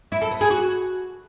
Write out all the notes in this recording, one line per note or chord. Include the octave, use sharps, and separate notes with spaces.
E4
A4
B3
G#4
F#4